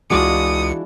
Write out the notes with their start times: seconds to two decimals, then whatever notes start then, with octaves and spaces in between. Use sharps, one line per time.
0.10 C#2 E3 G#3 D4 F4 F#4 D#6 C#7